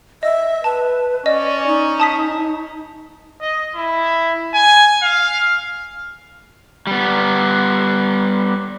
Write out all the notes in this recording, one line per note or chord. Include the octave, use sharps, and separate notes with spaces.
D#5 E5
B4 A5
C#4 D5 D#5
D#4
A5 D#6 B6
D#5
E4
G#5
F5
G3 B3